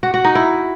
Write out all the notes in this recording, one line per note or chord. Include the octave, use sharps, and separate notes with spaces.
F#4
F#4
D#4
E4